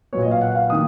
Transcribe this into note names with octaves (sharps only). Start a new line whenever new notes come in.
A#2 F#3 B3 C#5
D#5
F5
F#5
F5
D#3 A#3 D#6